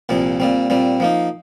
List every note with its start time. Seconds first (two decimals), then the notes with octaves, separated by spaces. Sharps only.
0.09 C2 A#2 F3 C4
0.40 A#2 G3 C4
0.70 A#2 G3 C4
1.00 F3 A#3 D#4